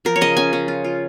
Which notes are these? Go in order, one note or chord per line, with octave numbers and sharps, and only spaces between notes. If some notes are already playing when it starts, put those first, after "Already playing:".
F3 A#4
C#5
C#3 D#5
C#4 G#5
C#4
F4
F4